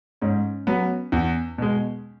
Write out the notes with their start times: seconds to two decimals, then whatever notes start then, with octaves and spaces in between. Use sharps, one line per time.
0.21 G#2 C#4
0.67 F#3 B3
1.12 E2
1.58 B2 G#3